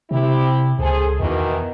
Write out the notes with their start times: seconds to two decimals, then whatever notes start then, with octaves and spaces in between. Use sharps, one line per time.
0.11 C3 C4 E4 G4
0.79 C#2 G#4 A4 C5
1.20 E2 B2 D#3 E3